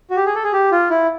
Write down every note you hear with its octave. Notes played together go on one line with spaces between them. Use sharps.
F#4
G4
G#4
A4
G#4
G4
F4
E4